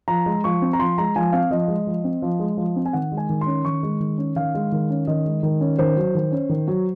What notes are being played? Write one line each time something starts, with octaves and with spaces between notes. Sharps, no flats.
F3 A#5
G#3
F3 C#6
C4
A#5
F3 C6
G#3 A#5
F3 G#5
C4 F5
F3 D#5
G#3
F3
C4
F3
G#3
F3
C4
G#5
D#3 F#5
G#3
G#5
D#3
C6
C#4
D#3 C#6
G#3
D#3
C#4
D#3 F5
G#3
D#3
C#4
D#3 D#5
G#3
D#3
C#4
D#3 C5
F#3
D#3
C#4
D#3
F#3